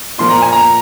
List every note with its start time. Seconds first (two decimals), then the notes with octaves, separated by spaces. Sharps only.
0.18 A#2 F3 A#3 C6
0.30 A#5
0.42 G#5
0.52 A#5